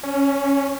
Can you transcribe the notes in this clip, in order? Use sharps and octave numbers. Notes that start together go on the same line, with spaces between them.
C#4